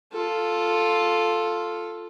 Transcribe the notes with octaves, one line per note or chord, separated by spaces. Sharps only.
F4 A4